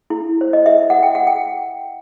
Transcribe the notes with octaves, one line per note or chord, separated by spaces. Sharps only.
E4
C5
D#5
E5
E5
F#5
G5
F#5
G5